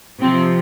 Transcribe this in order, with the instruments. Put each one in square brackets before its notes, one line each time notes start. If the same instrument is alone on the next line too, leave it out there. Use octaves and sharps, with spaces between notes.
[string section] C3 F3 C4